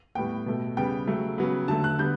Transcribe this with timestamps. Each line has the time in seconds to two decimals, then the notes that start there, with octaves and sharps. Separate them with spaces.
0.15 A2 G3 B3 G5
0.46 B2 A3
0.77 C#3 G3 B3 G5
1.07 C#3 F#3 A3
1.38 C#3 F#3 B3
1.68 D3 F#3 A3 A5
1.84 F#6
1.99 D3 G3 B3 G6